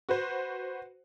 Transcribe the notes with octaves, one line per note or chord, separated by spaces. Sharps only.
F#4 B4 C5